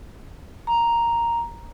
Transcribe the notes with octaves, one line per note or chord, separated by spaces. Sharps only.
A#5